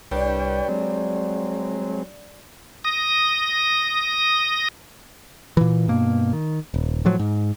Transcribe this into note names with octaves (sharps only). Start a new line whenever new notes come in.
C2 G3 D4 B4 C#5 G5
F#3 G#3 C4
D#6 A#6
A#2 E3
G2 B2 A#3
D#3
D#1
A2 F3 F#3
G#2